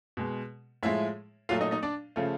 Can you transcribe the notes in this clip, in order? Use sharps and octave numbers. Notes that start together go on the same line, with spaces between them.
B2 G#3
A2 F3 G#3 E4 E5
A#2 F#3 A3 F4 F5
D#4 D#5
D#4 D#5
D4 D5
C#3 F3 A3